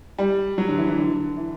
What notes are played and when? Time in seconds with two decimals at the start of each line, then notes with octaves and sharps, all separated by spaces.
0.19 G3
0.58 F#3
0.68 D3
0.78 E3
0.88 E3
0.98 D3
1.37 E3